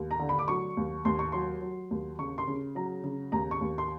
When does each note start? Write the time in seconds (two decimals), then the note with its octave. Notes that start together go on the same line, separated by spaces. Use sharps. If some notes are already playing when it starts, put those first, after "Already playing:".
Already playing: D#2
0.11 A#5
0.19 D3
0.29 B5
0.39 D6
0.48 F#3 C#6
0.77 D#2
1.05 D#2 C6
1.19 C#6
1.32 F#3 C6
1.61 F#3
1.91 D#2
2.19 C#3 C#6
2.38 C6
2.47 C#3
2.75 F#3 A#5
3.04 C#3
3.32 D#2 A#5
3.51 C#6
3.61 D#2
3.78 C6